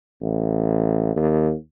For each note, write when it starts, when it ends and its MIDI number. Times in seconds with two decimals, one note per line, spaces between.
0.21 1.13 33
1.16 1.53 39